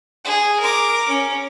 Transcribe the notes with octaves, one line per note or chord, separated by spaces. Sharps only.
G#4
A#4 D6
C#4